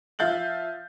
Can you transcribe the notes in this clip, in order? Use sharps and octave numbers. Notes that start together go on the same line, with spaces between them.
F3 E5 F5 G6 A6 F#7